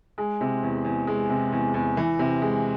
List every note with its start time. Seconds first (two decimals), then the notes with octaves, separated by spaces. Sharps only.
0.18 G#3
0.41 C3
0.63 E2
0.85 E2
1.07 G#3
1.30 C3
1.52 E2
1.74 E2
1.97 E3
2.19 C3
2.42 G#3